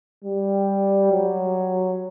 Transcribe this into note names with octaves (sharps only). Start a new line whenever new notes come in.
G3
F#3